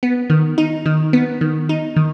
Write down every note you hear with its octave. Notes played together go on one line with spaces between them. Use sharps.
B3
D#3
D#4
D#3
B3
D#3
D#4
D#3